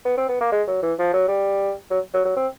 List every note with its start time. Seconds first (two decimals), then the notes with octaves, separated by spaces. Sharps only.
0.05 B3
0.18 C4
0.29 B3
0.41 A#3
0.52 G#3
0.68 F#3
0.83 E3
0.99 F3
1.13 F#3
1.28 G3
1.91 F#3
2.14 F#3
2.25 F#3
2.36 C4